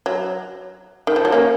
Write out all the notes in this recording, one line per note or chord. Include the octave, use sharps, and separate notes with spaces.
F#3
D#3
F3
F#3
A#3 C#4